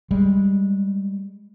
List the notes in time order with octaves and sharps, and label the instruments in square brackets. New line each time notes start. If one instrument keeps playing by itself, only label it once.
[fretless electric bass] G3 G#3